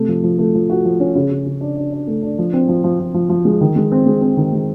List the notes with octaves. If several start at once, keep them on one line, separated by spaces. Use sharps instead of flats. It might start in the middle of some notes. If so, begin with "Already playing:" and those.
Already playing: C3 A3
F3
F3
A3
F3
F#4
F3
C#4
C#3
C#3
C#3
D4
D4
D4
A3
D4
F3
C4
F3
F3
F3
F3
F3
G#3
D#3
G#3
C4
G#3
C4
D#3
G#3